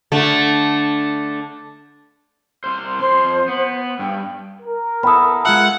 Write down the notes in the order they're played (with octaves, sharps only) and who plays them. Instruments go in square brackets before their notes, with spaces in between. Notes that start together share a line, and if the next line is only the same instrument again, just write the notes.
[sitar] D3 A3
[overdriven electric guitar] C2 C5
[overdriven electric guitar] F2 C6 [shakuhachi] C5
[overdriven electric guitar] B3
[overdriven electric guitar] G2 [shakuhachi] G5
[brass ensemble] A#4
[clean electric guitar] B3 E4 A4 [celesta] B5 D#6
[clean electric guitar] G#3 F4 E5 [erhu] F#5